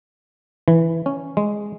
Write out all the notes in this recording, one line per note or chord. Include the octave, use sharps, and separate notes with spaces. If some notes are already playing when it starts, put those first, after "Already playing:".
E3
C#4
G#3